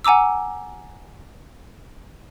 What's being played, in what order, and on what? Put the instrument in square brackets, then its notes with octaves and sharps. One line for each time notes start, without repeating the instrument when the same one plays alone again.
[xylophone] F#5 G#5 A#5 D6 E6